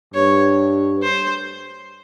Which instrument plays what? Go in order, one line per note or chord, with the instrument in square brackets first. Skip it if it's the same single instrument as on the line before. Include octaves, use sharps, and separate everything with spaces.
[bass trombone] G2 [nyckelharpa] C#5
[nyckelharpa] C5